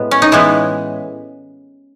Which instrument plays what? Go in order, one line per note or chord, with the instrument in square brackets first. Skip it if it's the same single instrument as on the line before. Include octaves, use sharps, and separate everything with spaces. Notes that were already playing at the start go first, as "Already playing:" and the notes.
Already playing: [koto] A2 G#3 B3
C#4
D#4
A2 E3 G#3 B3 E4